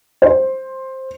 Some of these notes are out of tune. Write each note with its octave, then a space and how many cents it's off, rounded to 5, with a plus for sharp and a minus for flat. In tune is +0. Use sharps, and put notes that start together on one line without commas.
C5 +10